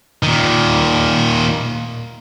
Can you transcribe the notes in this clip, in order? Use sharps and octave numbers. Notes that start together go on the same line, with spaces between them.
A#2 D#3